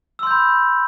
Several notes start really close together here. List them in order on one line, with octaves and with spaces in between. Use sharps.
E6 C6 G6 B5